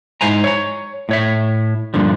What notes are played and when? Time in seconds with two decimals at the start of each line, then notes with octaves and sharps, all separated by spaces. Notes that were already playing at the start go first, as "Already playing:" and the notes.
0.21 G#2 E4 C5 G#5 A#5
0.44 C#5 A#5
1.09 A2 C#5 E5
1.94 G2 A#2 D3 F3